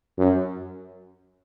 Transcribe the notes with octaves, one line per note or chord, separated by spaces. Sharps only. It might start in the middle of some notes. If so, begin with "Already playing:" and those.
F#2